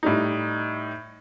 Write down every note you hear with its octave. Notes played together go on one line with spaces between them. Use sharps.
A2 G3 D#4